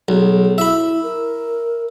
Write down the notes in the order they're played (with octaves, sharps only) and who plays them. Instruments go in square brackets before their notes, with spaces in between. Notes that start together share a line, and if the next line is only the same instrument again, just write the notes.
[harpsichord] B1 [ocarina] G#4
[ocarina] E4 [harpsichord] E5 B5
[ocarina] A#4